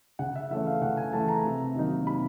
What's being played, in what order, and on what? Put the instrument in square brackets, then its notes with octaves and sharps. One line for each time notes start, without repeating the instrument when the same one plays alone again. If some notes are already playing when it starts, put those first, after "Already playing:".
[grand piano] C#3 F#5
E5
E3 A3 C#4 E5
F5
C#3 F#5
G#5
E3 A3 C#4 A5
A#5
C3
D#3 F#3 A#3 D#4
C3 B5